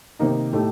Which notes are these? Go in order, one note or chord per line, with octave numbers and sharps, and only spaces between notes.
C3 D#3 A#3 D#4
A2 A3 D#4 G4